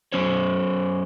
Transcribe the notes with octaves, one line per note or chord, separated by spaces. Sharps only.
F#3 C#4 C5 C#5